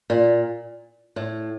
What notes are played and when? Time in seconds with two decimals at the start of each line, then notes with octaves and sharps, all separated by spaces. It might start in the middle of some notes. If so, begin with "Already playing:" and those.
0.10 A#2
1.16 A2